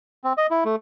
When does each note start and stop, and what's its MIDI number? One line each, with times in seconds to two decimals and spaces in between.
0.24 0.33 60
0.37 0.47 75
0.50 0.64 64
0.65 0.76 57